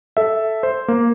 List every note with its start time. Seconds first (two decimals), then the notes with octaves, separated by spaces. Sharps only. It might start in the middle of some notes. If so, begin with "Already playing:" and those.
0.17 A4 E5
0.63 C5
0.88 A#3